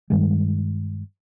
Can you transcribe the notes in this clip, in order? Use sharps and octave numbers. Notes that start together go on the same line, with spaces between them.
G2 D#3 G3 G#3